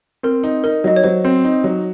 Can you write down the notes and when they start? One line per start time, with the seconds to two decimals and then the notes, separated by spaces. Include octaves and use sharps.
0.23 C4 A#4
0.44 D#4
0.64 D#4 A#4
0.84 F#3 D#5
0.96 C#5
1.04 F#3 C5
1.24 C4
1.45 D#4
1.64 F#3